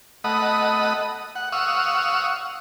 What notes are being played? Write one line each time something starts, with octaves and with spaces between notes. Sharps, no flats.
A3 D#5 F#5 B5 D#6
F#5
F5 F#5 C#6 D#6 E6